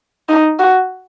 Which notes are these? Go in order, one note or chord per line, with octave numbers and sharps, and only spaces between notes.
D#4
F#4